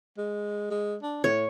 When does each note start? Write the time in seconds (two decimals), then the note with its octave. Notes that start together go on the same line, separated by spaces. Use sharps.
0.18 G#3
0.71 G#3
1.03 D4
1.24 A2 C#5